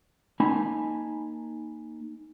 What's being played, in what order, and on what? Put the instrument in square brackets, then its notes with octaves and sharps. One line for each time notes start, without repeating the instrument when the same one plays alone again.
[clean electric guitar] A#3 D#4 G#5 A5 B5